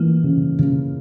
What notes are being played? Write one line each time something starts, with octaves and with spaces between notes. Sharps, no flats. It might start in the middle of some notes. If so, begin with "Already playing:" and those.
Already playing: E3 A#3
C#3
C#3